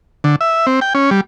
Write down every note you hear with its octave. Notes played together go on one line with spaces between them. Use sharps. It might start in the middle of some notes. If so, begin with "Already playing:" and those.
D3
E5
C4
G5
C#4
G3